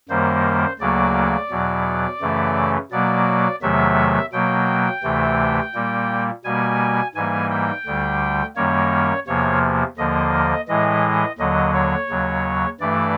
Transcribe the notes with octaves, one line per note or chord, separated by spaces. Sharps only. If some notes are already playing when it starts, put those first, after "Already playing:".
F#2 D#3 G3 A#3 C5
D2 C#3 F#3 A#3 D5
E2 B2 F#3
F#2 C#3 E3 A3
B2 F#3 A#3 D5
E2 C3 D#3 F#3 A3 E5
B2 F#3 A#3 G5
D2 C3 E3 A3
A#2 G3 A#3
B2 G3 A#3 G#5
G#2 E3 G3 A#3 G#5
G5
D2 D3 G3
F#2 D#3 G3 A#3 C#5
E2 C3 F3 A#3 C#5
D#2 D3 F3 A#3 D#5
A2 E3 G#3 D#5
D#2 D3 F#3 D#5
C#5
D#2 C#3 F#3
G2 E3 A3 D5